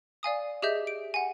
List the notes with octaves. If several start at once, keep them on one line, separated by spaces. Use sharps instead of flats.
D5 F5 G#5 D#6
G4 G#4 D#5 E5 G6
D7
F#5 G#5